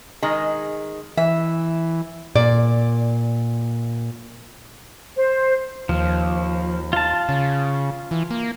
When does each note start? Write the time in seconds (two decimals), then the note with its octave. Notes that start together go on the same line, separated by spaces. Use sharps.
0.22 D#3 G#3
1.17 E3 E5
2.35 A#2 D5
5.16 C5
5.89 D#2 F3
6.93 F4 A5
7.29 C#3
8.11 E3
8.31 A#3